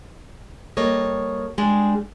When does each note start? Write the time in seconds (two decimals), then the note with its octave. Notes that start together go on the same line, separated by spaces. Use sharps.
0.77 G3 A#3 A4 C#5 D#5
1.58 G3 G#3 D4 G#4